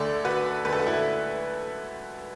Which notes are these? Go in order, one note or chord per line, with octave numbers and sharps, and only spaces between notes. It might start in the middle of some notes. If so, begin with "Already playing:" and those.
Already playing: D2 D3 A3 A4 D5
F#4 B4
D2 D3 A3 B4
A4
F#4
E4 A4